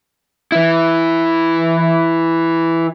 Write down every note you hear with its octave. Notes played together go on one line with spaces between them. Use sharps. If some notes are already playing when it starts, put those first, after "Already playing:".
E3 E4